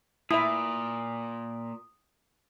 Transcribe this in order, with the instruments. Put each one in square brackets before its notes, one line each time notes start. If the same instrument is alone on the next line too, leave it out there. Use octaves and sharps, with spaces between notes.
[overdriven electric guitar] A#2 [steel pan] E4 E5 [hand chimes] D#6